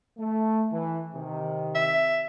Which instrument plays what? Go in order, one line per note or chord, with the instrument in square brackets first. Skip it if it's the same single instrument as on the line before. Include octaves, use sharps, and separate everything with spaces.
[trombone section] A3
E3
C3 D#3
[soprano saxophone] E5